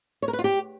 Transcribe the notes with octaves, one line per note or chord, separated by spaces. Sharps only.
C#5
A#4
B4
F4
G4